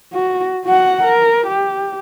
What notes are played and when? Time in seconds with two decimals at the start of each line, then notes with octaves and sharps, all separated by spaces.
0.13 F#4
0.66 F#4 F#5
1.03 A#4
1.47 G4